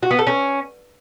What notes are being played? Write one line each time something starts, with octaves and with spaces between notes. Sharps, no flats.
F#4
B3
A4
C#4